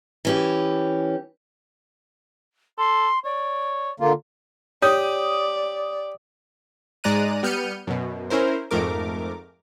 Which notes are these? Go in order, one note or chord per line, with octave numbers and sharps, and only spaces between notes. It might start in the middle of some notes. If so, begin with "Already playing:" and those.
E3 C#4 G4
A4 C6
C#5 D5
D3 A#3 F4
G4 C#5 D5 D#6
G#2 G#3 D5 A#5 F#6 D#7
G3 B3 F6 G6 C#7 D#7
F#2 B2
C#4 E4 A#4 C5
F2 G#2 A3 A#4 D6